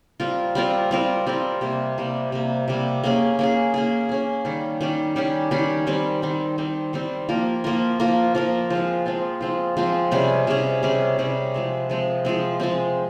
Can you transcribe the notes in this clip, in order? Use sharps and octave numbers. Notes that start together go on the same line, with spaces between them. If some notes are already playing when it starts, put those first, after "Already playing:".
G3 C4 F4 A#4
G3 C4 F4 A#4
G3 C4 F4 A#4
G3 C4 F4 A#4
C3 G3 A#3
C3 G3 A#3
C3 G3 A#3
C3 G3 A#3
A#3 C#4 G#4
A#3 C#4 G#4
A#3 C#4 G#4
A#3 C#4 G#4
D#3 G3 C#4 G4
D#3 G3 C#4 G4
D#3 G3 C#4 G4
D#3 G3 C#4 G4
D#3 G3 C4
D#3 G3 C4
D#3 G3 C4
D#3 G3 C4
F3 A#3 F4 A#4
F3 A#3 F4 A#4
F3 A#3 F4 A#4
F3 A#3 F4 A#4
F3 G#3 C4 F4
F3 G#3 C4 F4
F3 G#3 C4 F4
F3 G#3 C4 F4
C3 G3 C#4 G#4
C3 G3 C#4 G#4
C3 G3 C#4 G#4
C3 G3 C#4 G#4
F3 G#3 C4
F3 G#3 C4
F3 G#3 C4
F3 G#3 C4